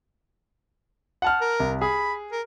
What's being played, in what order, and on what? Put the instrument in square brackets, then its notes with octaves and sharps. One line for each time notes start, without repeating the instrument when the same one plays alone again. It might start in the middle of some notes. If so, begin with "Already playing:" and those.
[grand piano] F#5 A5 F6
[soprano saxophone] A#4
[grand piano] C2
[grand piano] G#4 [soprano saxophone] B5
[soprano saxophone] A#4